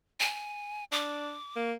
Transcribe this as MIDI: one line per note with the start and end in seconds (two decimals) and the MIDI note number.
0.20 0.84 80
0.92 1.35 62
0.92 1.71 86
1.56 1.73 58